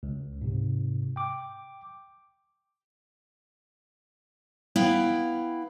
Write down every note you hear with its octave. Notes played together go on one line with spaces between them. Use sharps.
C#2
G#2 C3
G5 D6
B3 E4 F5 G5